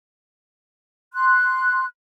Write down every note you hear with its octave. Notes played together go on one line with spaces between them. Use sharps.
C6 F#6